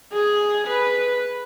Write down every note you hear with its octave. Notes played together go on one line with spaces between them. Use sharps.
G#4
B4